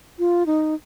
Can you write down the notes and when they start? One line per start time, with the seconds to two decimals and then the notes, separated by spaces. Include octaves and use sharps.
0.19 F4
0.46 D#4